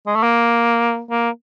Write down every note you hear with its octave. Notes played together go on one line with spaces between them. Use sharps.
G#3
A3
A#3
A#3